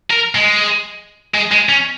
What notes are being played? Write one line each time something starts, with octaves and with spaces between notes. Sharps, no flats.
A#4
G#3
G#3
G#3
C#4